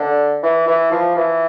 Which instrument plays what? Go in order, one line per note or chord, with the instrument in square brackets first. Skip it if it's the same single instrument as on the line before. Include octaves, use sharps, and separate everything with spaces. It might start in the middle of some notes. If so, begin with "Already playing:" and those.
Already playing: [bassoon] D3
E3
E3
F3
E3